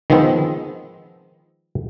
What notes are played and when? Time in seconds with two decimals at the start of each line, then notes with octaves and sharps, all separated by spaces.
0.10 D#3 F3 G#3 B3 C4